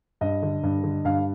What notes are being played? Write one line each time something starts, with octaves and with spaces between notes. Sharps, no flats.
G2 D#5
D3
G2
D3
G2 F5